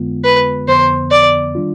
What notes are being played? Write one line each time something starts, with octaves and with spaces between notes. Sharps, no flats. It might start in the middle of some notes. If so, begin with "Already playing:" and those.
Already playing: F2 D3 G#3 B3 F4
B4
F2 D3 F3 B3 C5
D5
D#3 G3 D4 F4